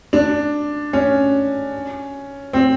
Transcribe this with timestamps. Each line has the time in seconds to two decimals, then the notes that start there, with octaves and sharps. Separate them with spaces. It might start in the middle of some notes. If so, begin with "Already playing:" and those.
0.13 D4
0.93 C#4
2.53 C4